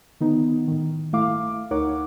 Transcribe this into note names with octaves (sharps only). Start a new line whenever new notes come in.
D3 D#3 B3 D#4
A2 D#3
G1 A3 E4 F5 D6
D2 D#4 A#4 C#5 F#5 D6